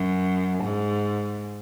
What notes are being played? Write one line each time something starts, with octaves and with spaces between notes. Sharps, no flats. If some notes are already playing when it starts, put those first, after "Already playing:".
Already playing: F#2
G#2